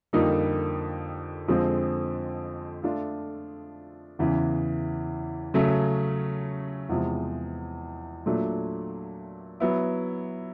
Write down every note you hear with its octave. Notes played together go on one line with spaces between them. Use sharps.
F2 D3 G3 A#3 D#4
F2 D3 F3 G#3 C4
A3 D4 F4
E2 C#3 E3
C#3 F#3 A3 C#4
E2 C3 F3 G#3
A#2 F#3 A3 D4
F#3 B3 E4